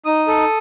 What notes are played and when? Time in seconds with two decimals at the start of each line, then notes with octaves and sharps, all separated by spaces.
0.05 D#4 D#6
0.28 A4